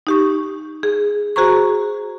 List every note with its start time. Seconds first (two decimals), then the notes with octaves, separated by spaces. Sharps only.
0.07 D#4 G4 C#6
0.83 G#4
1.36 F#4 G#4 C5 A#5 C#6